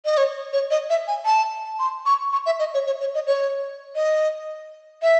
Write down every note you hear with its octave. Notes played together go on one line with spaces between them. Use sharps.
D#5
C#5
C#5
D#5
E5
G#5
A5
C6
C#6
C#6
E5
D#5
C#5
C#5
C#5
D#5
C#5
D#5
E5